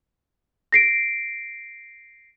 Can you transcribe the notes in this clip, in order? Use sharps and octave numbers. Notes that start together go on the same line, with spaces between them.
A#6 C7 D7